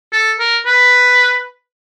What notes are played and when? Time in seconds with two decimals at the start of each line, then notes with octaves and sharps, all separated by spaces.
0.13 A4
0.39 A#4
0.66 B4